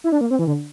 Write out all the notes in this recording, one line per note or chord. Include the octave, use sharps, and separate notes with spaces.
E4
D4
A#3
C4
E3
D3